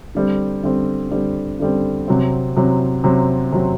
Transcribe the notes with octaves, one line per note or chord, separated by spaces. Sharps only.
D3 G3 C4
D3 G3 C4
D3 G3 C4
D3 G3 C4
C3 F#3 C4
C3 F#3 C4
C3 F#3 C4
C3 F#3 C4